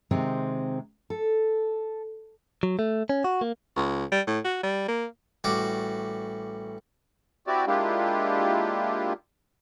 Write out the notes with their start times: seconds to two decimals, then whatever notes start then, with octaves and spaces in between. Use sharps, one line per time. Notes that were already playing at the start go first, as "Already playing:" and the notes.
0.11 C3 D#3 G#3 C4
1.10 A4
2.63 F#3
2.79 A3
3.09 C#4
3.24 F#4
3.41 A#3
3.76 C#2
4.12 G3
4.27 A2
4.44 F#4
4.63 G3
4.88 A#3
5.44 A1 G3 F#4 D6
7.47 C4 E4 F#4 G4 D5
7.67 G#3 A#3 D4 E4 F4 G4